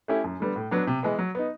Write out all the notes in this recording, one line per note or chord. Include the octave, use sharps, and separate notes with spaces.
A3 C#4 E4 G4
F#2
D3 G3 B3
A2
F#3 B3 D4
C3
E3 G#3 B3
F#3
B3 D#4